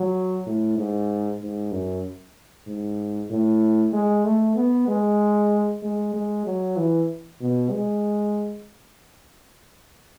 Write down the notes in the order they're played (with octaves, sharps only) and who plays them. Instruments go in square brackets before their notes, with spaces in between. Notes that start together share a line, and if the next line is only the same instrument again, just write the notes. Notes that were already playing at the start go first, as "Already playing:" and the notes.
Already playing: [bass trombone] F#3
A2
G#2
G#2
F#2
G#2
A2
G#3
A3
B3
G#3
G#3
G#3
F#3
E3
B2
G#3